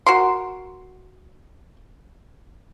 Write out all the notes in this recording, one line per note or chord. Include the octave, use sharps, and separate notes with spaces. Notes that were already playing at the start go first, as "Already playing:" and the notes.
F#4 A#4 C6